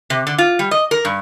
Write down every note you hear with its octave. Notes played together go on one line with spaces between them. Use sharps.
C3
D3
F4
G3
D#5
A#4
G2